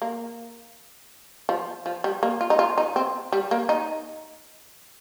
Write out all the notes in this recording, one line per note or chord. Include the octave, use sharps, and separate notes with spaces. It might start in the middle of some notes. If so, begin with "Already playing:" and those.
A#3
F3
F3
G3
A#3
F4
D#4
F4
D#4
C4
G3
A#3
D#4